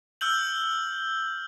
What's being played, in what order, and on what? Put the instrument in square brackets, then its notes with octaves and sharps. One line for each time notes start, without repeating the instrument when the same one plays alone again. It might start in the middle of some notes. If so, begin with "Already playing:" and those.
[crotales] E6 F6 G6 F#7